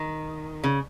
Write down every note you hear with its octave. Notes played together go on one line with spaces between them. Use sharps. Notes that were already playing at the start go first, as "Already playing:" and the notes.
Already playing: D#3
C#3